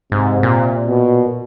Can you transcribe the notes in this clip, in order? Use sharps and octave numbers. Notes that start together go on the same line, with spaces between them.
G#2 C3
A#2
B2